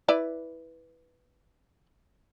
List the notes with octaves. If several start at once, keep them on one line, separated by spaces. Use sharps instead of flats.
E4 B4 D5